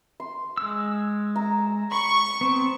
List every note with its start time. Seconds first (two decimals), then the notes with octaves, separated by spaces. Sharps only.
0.20 C6
0.57 G#3 E6
1.36 A#5
1.92 B5 C#6
2.41 B3 C4